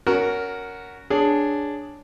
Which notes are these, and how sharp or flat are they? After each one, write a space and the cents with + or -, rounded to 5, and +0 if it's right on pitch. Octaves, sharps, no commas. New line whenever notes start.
C#4 +25 F#4 +0 A#4 +0
D4 +0 G#4 +0 C#5 +0